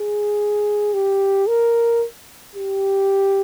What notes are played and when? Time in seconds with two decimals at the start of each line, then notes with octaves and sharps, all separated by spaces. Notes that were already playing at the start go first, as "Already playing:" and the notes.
Already playing: G#4
0.94 G4
1.47 A#4
2.56 G4